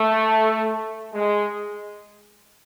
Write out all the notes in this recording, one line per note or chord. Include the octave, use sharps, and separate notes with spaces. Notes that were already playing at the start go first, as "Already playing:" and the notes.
Already playing: A3
G#3